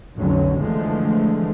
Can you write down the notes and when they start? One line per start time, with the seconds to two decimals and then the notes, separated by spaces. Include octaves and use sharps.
0.18 F1 B1 D3 F#3 C#4
0.61 D3 E3 F3 G#3 A3